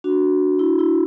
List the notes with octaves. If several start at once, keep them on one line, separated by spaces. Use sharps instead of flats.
D4 F#4
E4
E4